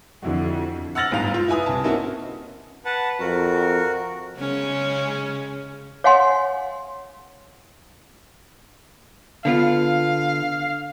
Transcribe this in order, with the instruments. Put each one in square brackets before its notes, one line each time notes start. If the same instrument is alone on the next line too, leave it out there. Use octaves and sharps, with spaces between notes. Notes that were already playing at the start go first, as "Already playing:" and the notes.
[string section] F2 [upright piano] D3 E4 F#4
[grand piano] F#5 E6 F6 A6 A#6 F#7
G1 D2 G#2 F5 F7
F4
E4 B4 G#5 D#6
C2 A5
A#3 C4 C#4 D#4 E4 F#4
[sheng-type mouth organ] B4 F#5 A5
[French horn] F2 [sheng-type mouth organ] F#4 A#4
[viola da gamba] C#3 G#3 C#4
[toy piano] C#5 F5 F#5 G#5 C6
[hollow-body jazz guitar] D3 B3 F4 [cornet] F5